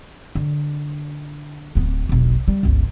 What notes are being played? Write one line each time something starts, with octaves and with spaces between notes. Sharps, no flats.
D3
D1 B3
E1 B1
G3
G1 C#2